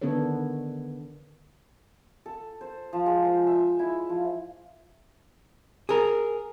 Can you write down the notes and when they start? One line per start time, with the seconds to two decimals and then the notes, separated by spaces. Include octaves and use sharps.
0.02 D3 D#3 B3 D4 A4 C#5
2.26 A4
2.61 C5
2.93 F3
3.06 G#3
3.25 C5
3.47 E5
3.79 E4
4.09 F3
5.89 G#4 A#4